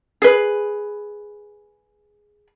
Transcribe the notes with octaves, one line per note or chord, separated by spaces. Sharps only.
G#4 B4